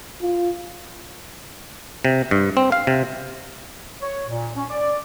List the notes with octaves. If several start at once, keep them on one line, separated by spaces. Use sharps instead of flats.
F4
C3
G2
C4
F5
C3
C#5
A#2
C#4
D5